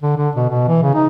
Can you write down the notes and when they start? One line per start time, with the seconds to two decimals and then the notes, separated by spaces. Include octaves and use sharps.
0.03 D3
0.17 D3
0.36 B2
0.50 B2
0.68 E3
0.83 C#3
0.95 D#4